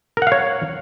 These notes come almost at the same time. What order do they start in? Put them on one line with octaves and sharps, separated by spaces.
A#4 F#5 F5 C#5